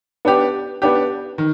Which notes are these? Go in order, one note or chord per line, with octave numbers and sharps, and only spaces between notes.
B3 D4 G4
B3 D4 G4
D#3